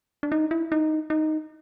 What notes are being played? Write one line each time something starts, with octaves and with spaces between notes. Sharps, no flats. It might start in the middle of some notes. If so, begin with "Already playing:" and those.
D4
D#4
E4
D#4
D#4